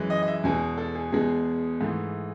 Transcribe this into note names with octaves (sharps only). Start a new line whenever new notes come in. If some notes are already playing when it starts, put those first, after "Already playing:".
Already playing: F#2 E3 G#3
D#5
D#5
E5
E2 B2 G#3 G#5
A4
G#4
E2 B2 G#3 G#4
G#2 E3 A3